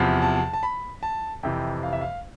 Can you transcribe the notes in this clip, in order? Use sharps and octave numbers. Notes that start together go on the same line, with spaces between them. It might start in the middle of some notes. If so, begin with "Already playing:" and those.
Already playing: E2 C3 F3
A5
A5
B5
A5
F2 C3 E3 G5
F5
E5
F5